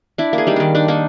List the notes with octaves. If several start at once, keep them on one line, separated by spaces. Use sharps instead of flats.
D4 E4
A#3
G#4
G3 D#4
D#3 D4
D4 D#4
A#3 D#4